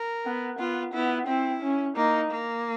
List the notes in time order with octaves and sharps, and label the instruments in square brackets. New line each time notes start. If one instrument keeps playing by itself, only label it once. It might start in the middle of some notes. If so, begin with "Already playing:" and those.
Already playing: [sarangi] A#4
[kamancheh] B3
[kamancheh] B3 [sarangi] F4
[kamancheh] B3 [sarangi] E4
[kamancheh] C4 [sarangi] E4
[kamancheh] C#4
[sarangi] A#3 [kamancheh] D#4
[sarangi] A#3